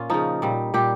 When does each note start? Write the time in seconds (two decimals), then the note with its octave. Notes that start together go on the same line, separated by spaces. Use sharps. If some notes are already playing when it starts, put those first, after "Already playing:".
Already playing: A#2 C#4 F4
0.10 C#3 F3 D#4
0.42 A#2 G3
0.74 A#2 G3 G4